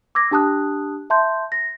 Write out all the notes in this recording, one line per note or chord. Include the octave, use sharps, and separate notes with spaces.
D6 E6 G#6 A#6
D4 G4 A5 D#6 F#6
E5 A5 C6 G6
A#6